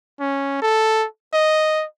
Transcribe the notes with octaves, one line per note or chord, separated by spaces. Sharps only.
C#4
A4
D#5